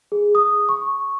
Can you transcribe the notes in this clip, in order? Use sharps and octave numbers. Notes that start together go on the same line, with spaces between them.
G#4
D#6
C#6